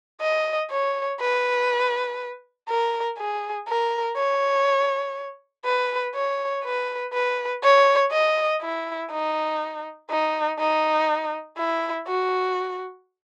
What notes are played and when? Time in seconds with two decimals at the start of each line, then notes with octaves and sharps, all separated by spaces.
0.21 D#5
0.71 C#5
1.20 B4
2.69 A#4
3.18 G#4
3.68 A#4
4.17 C#5
5.65 B4
6.15 C#5
6.64 B4
7.13 B4
7.64 C#5
8.12 D#5
8.61 E4
9.11 D#4
10.10 D#4
10.59 D#4
11.58 E4
12.07 F#4